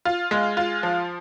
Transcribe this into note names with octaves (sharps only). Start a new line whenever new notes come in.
F4
G#3
F4
F3